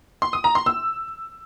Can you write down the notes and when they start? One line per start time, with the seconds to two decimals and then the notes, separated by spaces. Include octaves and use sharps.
0.22 C6
0.33 D#6
0.44 A#5
0.55 C6
0.66 E6